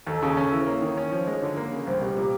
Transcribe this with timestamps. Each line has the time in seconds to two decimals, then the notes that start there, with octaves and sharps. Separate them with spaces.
0.07 D#2 A4
0.22 C#3
0.37 C#4
0.52 E3
0.62 C5
0.66 A#3 C#5
0.81 D#3
0.97 C#4
1.11 F3
1.27 G#3
1.42 D3
1.56 A#3
1.72 C#3
1.87 C2 C5
2.01 B2 G4
2.17 A#2